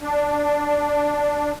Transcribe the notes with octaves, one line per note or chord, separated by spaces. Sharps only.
D4